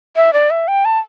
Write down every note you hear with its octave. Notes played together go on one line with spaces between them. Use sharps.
E5
D5
E5
G5
A5